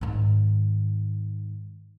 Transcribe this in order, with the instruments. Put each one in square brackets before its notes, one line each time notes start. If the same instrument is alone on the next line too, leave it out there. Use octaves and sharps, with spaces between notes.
[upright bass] G#2 D#3